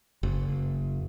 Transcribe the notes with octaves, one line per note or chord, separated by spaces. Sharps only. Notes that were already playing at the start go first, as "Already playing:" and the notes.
F#1